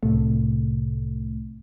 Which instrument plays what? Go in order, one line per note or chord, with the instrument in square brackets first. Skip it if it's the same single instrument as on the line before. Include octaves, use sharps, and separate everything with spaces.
[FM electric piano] C2 A2 C3 A3